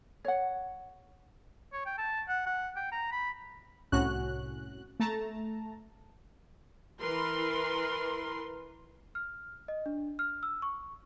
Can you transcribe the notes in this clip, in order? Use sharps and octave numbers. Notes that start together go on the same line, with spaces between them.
C#5 F#5
C#5
G5
A5
F#5
F#5
G5
A#5
B5
C2 A2 C#4 F#4 F#6
A3 A5 A#5
E3 A#4 B4 C6
F6
D#5
D4
F6
E6
C#6